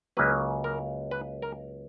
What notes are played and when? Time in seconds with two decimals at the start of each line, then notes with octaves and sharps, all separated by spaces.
0.17 C#2 C#3 F#3 A#3 B4
0.64 A#4
1.11 B4
1.42 A#4